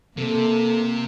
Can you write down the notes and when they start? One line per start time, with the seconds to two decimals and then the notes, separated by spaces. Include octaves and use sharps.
0.18 C3 A#3 A4